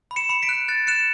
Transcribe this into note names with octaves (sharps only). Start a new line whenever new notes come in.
B5
C#7 E7
B5 C#7
B6 D7
F#6
F#6 A6
F#6 C#7 E7